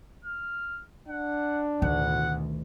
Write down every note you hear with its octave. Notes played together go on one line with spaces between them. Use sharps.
F6
D4 F#5
A1 D2 B2 D#3 F#5